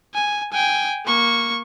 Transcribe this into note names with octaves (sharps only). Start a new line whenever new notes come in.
G#5
G5 G#5
A#3 C#6